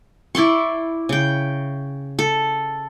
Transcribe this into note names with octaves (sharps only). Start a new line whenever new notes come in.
E4 D5 C6 C#6
C#3 G5
A4